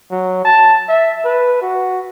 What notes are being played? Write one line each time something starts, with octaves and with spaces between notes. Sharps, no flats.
F#3
A5
E5
B4
F#4